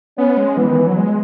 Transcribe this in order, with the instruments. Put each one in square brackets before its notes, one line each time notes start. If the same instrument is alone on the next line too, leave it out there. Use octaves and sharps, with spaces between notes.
[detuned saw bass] B3 [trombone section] C#4
[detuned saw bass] G#3
[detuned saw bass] E3 [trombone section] B3
[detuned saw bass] D#3
E3
F#3
G#3